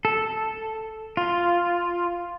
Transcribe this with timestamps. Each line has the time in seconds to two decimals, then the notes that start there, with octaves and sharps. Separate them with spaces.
0.05 A4
1.17 F4